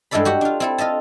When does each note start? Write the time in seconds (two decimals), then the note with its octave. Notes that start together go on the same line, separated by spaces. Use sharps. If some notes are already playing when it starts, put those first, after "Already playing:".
0.11 G2 G#3 E4 A4 D5 B5
0.25 F#4 G4 F#5
0.41 D4 F4
0.60 C4 E4 A4
0.78 F4 D#5 E5 A5